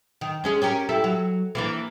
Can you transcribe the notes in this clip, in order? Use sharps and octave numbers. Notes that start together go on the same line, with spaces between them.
D#3
G#3 C#4 G#4
C#4 G4 A#4
E4 G4 A4
F#3
E3 A#3 D4